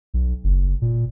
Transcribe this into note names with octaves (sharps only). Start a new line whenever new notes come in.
B1
F#1
A#2